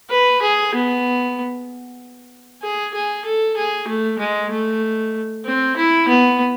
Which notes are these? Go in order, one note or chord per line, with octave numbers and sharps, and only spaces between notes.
B4
G#4
B3
G#4
G#4
A4
G#4
A3
G#3
A3
C4
E4
B3